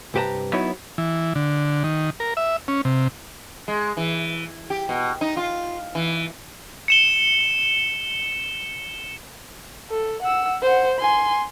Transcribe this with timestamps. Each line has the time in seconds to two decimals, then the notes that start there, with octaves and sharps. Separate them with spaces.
0.14 C2 G2 G4 B4 A5 A#5
0.53 F#3 B3 D#4 E4 C#5
0.98 E3
1.35 D3
1.84 D#3
2.20 A#4
2.37 E5
2.68 C#4
2.85 C3
3.68 G#3
3.97 E3
4.70 G4
4.89 B2
5.21 D#4
5.37 F4
5.95 E3
6.88 C#7 E7 G7
9.91 A4
10.22 F#5 E6
10.62 C5 F#5
10.99 G#5 C6